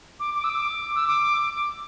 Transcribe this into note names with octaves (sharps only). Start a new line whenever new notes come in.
D6
D6
E6
D6
E6
D6